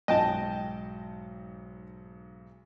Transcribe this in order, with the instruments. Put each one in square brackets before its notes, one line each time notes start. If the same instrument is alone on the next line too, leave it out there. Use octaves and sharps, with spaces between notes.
[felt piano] B1 G#2 [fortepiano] D#5 G5 A5